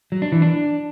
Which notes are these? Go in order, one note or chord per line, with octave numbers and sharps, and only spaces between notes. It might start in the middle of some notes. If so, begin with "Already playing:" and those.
F#3
D4
E3
D4